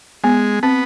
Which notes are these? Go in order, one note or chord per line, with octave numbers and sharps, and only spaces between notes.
G#3 B3
B3 C4